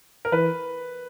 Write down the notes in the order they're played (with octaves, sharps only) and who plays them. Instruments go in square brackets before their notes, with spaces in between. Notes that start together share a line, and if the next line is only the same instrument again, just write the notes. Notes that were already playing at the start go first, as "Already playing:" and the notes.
[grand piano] A#4
[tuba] E3 [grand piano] B4